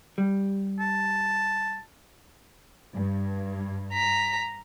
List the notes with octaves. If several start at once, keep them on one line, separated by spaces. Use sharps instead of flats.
G3
A5
G2
A#5 B6